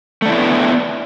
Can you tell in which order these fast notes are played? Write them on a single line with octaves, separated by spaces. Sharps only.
A3 D4 E4 C4 B3